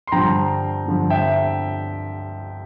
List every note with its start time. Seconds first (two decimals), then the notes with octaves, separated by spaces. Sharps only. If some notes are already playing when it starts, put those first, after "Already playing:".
0.07 C6
0.12 G2 D3 F3 G5 A#5
0.86 G2 D3 F3
1.10 E5 G5